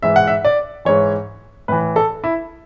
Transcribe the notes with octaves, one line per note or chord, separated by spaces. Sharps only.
G#2 E3 E5
F#5
E5
D5
G#2 E3 C#5
A2 E3 B4
A4
E4